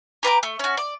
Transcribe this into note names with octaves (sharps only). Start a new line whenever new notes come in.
G4 B4 A#5 D6
A3
C#4 F#4
D5